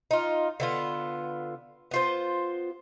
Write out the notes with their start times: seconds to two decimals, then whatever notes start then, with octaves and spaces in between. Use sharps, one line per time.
0.11 D#4 F4
0.60 D3 B3 F4
1.91 B3 F4 C5